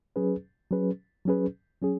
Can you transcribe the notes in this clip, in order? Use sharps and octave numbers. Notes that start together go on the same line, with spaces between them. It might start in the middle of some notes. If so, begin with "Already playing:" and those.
F#3 C#4 G#4 B4
F#3 C#4 G#4 B4
F#3 C#4 G#4 B4
F#3 C#4 G#4